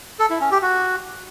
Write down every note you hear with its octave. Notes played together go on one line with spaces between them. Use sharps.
A4
E4
C#4
G4
F#4